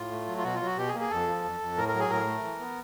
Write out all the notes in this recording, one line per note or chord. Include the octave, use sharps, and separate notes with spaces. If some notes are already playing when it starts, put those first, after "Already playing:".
Already playing: A2 F4
A3
F#3
F4
B2 F#4
F4
F#3 F#4
B2 G4
G#4
A#3
G#4
F2 A4
F3
F2
F2
A2 A#4
A#4
F#3
G#4
A2 A#4
A3
E3
B3